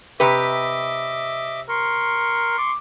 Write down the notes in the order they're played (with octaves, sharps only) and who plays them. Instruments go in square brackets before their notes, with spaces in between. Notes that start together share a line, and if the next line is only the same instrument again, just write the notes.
[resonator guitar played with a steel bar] C3 G4 B4 [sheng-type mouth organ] D#5 E5 D6
[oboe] A#4 [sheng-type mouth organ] C6 C#6
[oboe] D6